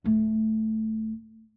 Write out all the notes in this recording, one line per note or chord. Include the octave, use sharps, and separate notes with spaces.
D1 A3